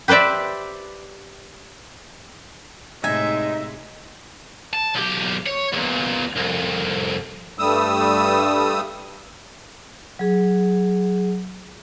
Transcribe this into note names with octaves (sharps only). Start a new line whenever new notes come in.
G4 B4 C5 D5 E5
A2 C3 G#3 D#4 E5 G#5
A5
B1 G4
C#5
E2 A#2
C2 F2
G2 G3 A3 D#6 E6
F#3 G#4